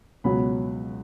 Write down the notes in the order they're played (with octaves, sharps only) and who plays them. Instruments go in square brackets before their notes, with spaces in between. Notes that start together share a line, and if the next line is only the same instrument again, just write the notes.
[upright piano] C#2 B2 F#3 B5